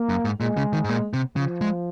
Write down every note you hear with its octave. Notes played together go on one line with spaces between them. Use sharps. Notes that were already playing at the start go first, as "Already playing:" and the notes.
Already playing: A#3
F#2
G#2
A#2 G#3
C#3
D#3
G#2
A#2
C3
C#3 F3
G#3